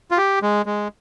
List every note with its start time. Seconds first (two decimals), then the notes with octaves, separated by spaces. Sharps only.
0.11 F4
0.17 G4
0.42 G#3
0.66 G#3